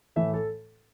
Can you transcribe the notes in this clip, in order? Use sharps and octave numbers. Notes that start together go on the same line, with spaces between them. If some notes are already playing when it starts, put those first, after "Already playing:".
A2 E3 A3 E5
A4